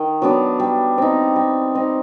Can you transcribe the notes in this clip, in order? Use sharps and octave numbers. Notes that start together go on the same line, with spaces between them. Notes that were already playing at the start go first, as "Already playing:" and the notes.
Already playing: D#3
F#3 B3 D4
G3
C4 D#4
G3
C4 D#4